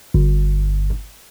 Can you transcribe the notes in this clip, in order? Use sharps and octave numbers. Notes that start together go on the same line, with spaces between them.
G1